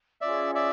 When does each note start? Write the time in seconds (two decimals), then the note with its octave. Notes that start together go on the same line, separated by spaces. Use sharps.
0.21 C#4 F4 G#4 D5 E5
0.55 D5 E5